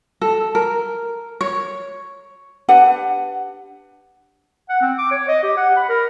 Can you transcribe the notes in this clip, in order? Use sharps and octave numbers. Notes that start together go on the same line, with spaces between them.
A4
A#4
C#5
D4 G4 B4 F#5
F#5
C4
D6
C#5
D#5
G4
F#5
B5
A#4